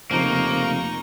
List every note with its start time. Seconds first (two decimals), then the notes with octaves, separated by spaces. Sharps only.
0.11 F1 C#3 F3 A#3 C4 D#4 C#6